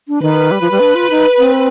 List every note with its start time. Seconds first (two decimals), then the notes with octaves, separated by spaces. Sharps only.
0.08 D4
0.22 D#3 B4
0.51 G3
0.61 F3
0.71 G3
0.80 D4
0.95 F4
1.10 D#4
1.39 C4